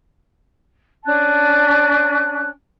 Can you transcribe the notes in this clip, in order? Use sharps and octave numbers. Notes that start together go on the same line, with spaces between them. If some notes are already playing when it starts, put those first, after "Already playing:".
C#4 D4 A5 F#6